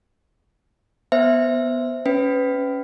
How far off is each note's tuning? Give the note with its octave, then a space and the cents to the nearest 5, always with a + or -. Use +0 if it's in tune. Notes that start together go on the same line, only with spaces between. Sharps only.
B3 +0 C5 +0 E5 +0
C#4 +0 B4 +25